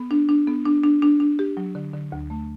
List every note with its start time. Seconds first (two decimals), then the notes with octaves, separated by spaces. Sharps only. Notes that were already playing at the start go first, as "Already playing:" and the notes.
Already playing: B3
0.11 D4
0.29 D4
0.47 B3
0.66 D4
0.84 D4
1.02 D4
1.20 D4
1.39 G4
1.57 F#3
1.75 D3
1.93 D3
2.12 D2
2.30 A3